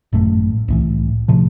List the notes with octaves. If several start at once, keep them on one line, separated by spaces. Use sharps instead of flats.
G#1 F#2 A2
C2 A2 E3
A2 C3 F3